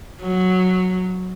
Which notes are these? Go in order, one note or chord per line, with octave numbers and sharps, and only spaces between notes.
F#3